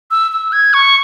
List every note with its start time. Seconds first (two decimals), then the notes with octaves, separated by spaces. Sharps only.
0.11 E6
0.32 E6
0.52 G#6
0.74 C#6